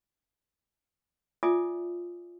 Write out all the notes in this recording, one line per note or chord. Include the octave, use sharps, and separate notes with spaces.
F4 D5 E5 G#5 D6 D#6